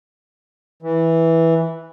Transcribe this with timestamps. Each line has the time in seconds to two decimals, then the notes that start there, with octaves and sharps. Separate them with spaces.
0.82 E3